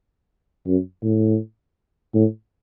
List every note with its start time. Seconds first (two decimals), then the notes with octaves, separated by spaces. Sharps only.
0.67 F#2
1.04 A2
2.14 A2